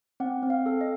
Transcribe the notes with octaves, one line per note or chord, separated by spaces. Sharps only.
C4 F#5
C4
F5
A4
D#5